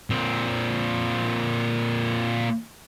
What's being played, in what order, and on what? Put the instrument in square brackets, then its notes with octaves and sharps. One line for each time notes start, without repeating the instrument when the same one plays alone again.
[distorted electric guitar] A#2 C4